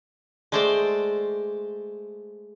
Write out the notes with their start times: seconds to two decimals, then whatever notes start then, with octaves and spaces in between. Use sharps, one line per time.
0.52 G#3 A3 C5 D5 G5